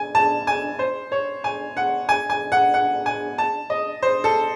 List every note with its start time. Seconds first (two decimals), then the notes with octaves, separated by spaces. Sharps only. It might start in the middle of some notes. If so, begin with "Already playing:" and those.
Already playing: G#5
0.15 A5
0.47 G#5
0.79 C5
1.12 C#5
1.44 G#5
1.77 F#5
2.09 G#5
2.30 G#5
2.52 F#5
2.74 F#5
3.06 G#5
3.38 A5
3.70 D#5
4.02 C5
4.24 A4